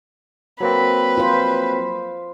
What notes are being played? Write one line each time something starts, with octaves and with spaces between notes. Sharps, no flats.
F#3 A#3 C4 B4
F4 C5